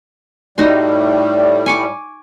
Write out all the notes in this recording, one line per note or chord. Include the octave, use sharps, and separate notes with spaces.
A2 G3 D#4 F#4 C6
G#5 C#6 D6